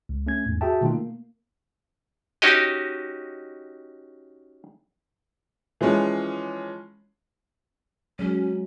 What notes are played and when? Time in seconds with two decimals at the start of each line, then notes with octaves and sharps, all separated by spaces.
0.09 C#2
0.27 A3 C#4 G#6
0.46 E2 G#2
0.61 F#4 G#4 E5 G5 A5
0.81 B2 D#3 A3 D#4 F4
0.94 A#3
2.42 C#4 D#4 F#4 G4 D#5
5.81 E3 F3 G#3 C#4
8.19 F#3 G#3 C#4